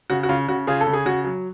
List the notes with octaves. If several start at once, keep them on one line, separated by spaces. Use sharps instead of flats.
C#3 F#4
F#4
C#3 F4
C#3 F#4
C#3 F4 G#4
A4
C#3
G#4
C#3 F#4
F#3